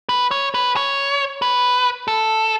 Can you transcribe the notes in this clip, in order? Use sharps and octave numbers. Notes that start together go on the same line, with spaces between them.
B4
C#5
B4
C#5
B4
A4